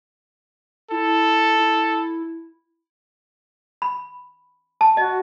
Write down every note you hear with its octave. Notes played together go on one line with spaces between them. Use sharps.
E4 A4
E4
B5
A5
F#4 D#5